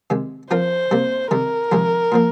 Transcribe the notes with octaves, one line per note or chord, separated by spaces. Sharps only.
C3 D#3 G#3
F3 C4 F4 A#4 C5
C3 G3 A#3
C3 D#3 G3 A#4
F2 C3 D#3 G#3
A#2 F3 A#3